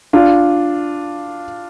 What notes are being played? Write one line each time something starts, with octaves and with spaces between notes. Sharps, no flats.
D4 F4